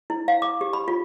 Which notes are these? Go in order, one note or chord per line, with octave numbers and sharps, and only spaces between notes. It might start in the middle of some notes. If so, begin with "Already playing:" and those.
E4
F5
D6
G4
B5
F4